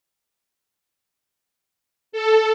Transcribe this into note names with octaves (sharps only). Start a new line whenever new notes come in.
A4